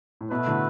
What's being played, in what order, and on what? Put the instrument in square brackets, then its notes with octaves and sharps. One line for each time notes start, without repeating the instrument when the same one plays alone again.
[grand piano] A2
[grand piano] B2 [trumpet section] A3 F#4 B4 E5
[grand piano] A2 D3